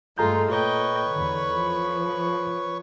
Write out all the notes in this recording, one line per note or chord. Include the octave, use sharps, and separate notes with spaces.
G2 G#3 A3 F4 G#4 A4 A#5 G6
A#2 B4 C#5 D#5 G5 C#6
E2 D3 B5
F3